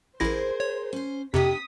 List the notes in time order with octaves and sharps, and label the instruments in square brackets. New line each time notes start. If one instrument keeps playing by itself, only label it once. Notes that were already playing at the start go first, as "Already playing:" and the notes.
[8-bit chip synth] A1 E4 A#6 [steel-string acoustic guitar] G#4 A#4 [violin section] C5
[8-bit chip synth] C#5
[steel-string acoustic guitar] C#4 C5
[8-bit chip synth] F2 C3 [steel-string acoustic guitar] B3 D4 [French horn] G4 [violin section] D#6 B6